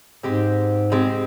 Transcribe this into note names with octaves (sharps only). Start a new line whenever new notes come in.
G#2 G#3 C4 G4
G#3 C4 G4